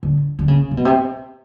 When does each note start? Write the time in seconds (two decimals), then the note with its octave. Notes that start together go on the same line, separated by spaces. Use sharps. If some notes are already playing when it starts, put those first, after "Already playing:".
0.03 D3
0.39 D3
0.48 C#3
0.71 C3
0.77 B2
0.85 C3